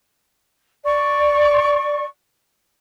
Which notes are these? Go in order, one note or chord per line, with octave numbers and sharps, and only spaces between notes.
D5 C#6